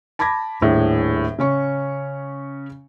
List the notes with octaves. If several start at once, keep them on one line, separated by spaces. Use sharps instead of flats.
A5 B5 D6 G#6 A#6
D#1 A2 D4 G#4
C#3 C#4 C#6